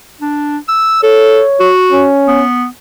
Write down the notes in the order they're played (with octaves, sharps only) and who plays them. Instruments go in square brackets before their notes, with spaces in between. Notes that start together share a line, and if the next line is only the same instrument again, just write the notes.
[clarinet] D4
E6
[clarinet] A4 [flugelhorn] C#5
[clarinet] F#4
[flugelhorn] C#4
[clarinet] B3